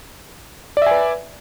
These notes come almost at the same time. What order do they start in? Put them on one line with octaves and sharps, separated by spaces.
D5 E5 G#5 B4